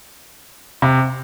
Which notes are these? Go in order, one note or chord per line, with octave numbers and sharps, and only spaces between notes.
C3